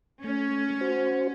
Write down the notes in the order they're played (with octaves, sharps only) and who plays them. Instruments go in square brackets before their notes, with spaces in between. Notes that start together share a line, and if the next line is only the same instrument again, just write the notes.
[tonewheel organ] A3 [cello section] C#4
[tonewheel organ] F#4 C5